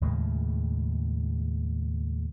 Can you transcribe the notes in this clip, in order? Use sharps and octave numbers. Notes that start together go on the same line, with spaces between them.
D#2 A2 C#3 G#3